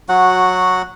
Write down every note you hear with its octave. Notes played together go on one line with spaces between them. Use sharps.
F#3 F#4 F#5